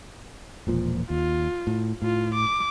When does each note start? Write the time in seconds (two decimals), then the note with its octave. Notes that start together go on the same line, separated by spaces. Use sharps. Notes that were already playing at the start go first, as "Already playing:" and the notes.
0.67 E1 A#2 F3
1.10 D#2 F4
1.67 A2
2.02 A2 F4
2.34 D6